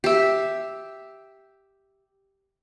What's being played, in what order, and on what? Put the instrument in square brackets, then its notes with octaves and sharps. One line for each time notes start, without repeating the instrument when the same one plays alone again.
[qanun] G4 E5